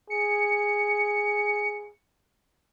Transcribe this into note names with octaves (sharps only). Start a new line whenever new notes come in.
G#4 C#7